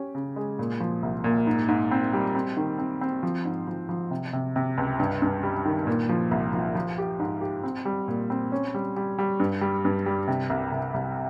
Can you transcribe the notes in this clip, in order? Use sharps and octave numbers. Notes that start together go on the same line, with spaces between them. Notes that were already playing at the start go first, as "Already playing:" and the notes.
Already playing: C#4 G4
C#3
G#3
A#2
F3
C2
A#2
G#2
G#2
C4
G3
C4
D#3
C4
C4
F3
G#2
F3
F3
C3
C3
C3
C#2
G2
G2
G3
D#3
A#2
F3
C2
F3
F3
G4
G#2
G4
C4
G3
A#2
C4
C#4
G3
G3
G3
G2
G3
G2
G3
C3
C2
C2
C2